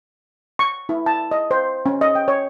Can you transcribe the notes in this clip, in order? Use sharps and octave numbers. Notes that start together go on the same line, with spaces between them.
C#6
E4
A5
D#5
C5
C#4
D#5
G5
C#5